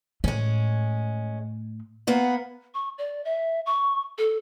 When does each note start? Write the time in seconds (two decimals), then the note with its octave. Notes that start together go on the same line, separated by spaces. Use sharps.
0.24 A2 G#3 C#4
2.07 A#3 B3 F#5
2.74 C#6
2.98 D5
3.25 E5
3.66 C#6
4.18 A4